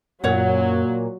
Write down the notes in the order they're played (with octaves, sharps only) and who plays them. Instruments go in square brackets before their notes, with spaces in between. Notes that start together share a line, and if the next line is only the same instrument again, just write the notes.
[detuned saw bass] F#2 [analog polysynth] A#2 [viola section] F#3 [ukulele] C#5 F#5